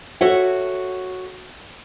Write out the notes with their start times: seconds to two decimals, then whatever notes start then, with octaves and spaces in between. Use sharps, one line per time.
0.21 F#4 A4 C#5 E5 F#5